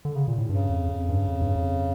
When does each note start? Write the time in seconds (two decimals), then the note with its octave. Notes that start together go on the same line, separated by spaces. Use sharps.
0.05 D3
0.15 C#3
0.28 A#2
0.38 A2
0.49 G2 C#3
0.69 F2
0.89 F2
1.09 G2
1.28 F2
1.42 G2
1.55 F2